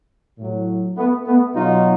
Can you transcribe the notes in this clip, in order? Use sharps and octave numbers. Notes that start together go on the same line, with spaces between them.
A2 F#3
A3 B3
A3 B3
B2 F#3 D#4 F4